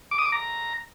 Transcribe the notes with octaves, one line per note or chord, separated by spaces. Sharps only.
D6
D#6
D6
A#5